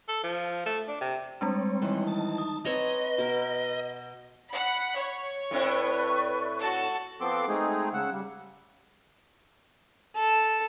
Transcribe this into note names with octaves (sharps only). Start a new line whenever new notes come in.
A4
F3
A3
D4
C3
G3 G#3 C4 D4 C#5
D#3 E3
D#4 A5
D#6
C4 B4 C#5 D#5 A#5
B2 A#4
F#5 B5
C#5
A2 C4 E4 B4 D5 C#6
F#4 A4 A5
F3 B3 C4 A4 C6 D6
G#3 A3 C4 D#4 G#4
C#3 F#5 E6
G3
A4